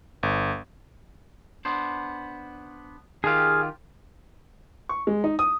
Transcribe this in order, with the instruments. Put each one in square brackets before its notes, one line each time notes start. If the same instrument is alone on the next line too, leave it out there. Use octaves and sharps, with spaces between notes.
[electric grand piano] G1
[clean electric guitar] B3 D4 C5
[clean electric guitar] D#3 F4 G4 [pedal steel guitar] G#4 F5
[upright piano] C#6
G#3
D#4
D#6